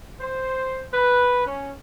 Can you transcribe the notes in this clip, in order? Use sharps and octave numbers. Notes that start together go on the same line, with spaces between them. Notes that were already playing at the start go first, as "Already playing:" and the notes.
C5
B4
C#4